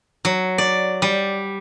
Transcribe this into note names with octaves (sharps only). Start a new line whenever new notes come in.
F#3
D5
G3